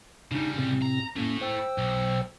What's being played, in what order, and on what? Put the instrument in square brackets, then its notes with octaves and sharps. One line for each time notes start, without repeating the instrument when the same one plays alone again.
[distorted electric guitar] C#3 G3 [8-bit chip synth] D4 D#4
[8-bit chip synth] A2 C3 C4
[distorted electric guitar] A#5
[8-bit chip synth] A2 A#3 C#4 [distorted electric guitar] A3 E4
[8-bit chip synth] C5 G5 E6
[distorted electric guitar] B1